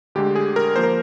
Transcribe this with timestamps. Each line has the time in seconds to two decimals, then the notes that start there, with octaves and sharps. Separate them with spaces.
0.15 D2 D3 G#3 G4
0.36 G#4
0.56 A#4
0.76 F3 A#3 C5
0.83 A#4